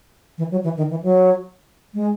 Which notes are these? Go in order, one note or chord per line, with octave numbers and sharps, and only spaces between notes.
E3
F#3
E3
D#3
E3
F#3
G#3